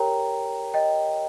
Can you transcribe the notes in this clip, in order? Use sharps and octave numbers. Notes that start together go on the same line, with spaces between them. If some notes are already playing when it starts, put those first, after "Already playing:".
Already playing: G4 A#4 C#5 G5 A#5
D#5 G5